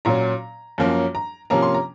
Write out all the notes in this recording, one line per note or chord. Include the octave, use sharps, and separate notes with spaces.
A#2 F#3 C#4 A#5
F#2 F3 A#3 C#4
A#5
C3 F3 A#3 C#4 A#5
C6
A#5